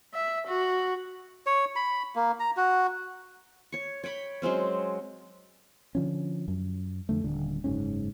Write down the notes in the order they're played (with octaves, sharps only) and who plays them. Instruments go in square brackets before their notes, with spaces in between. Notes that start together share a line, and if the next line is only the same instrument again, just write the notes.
[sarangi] E5
F#4
[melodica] C#5
B5
A#3
A#5
F#4
[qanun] C#5 C#6
C#5 G5 B5 C#6
F#3 G#3 C4 C#4
[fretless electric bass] D3 F3 C#4
F#2
F2 D3 A3
D#1 D3
F#1 G#2 C#4